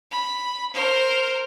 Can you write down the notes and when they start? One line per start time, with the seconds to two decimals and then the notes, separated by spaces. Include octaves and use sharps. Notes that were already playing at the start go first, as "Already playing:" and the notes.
0.11 B5
0.73 A#4 C5